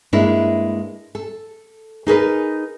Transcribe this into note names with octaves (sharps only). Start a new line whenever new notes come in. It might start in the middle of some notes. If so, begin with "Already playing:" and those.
G2 G#3 A#3 D4 E4
A4
D#4 G#4 A#4 B4